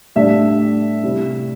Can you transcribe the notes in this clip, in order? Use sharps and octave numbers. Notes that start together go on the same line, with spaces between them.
A2 G3 D4 E5
C3 G3 C4 E4